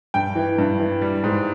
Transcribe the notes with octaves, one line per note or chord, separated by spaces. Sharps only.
G2 G5
E3
G2
E3
G3
G#2